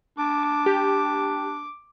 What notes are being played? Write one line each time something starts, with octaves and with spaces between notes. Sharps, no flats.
D4 D6
G4